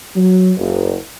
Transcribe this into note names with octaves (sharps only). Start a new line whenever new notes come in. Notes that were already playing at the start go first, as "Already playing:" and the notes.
F#3
F#1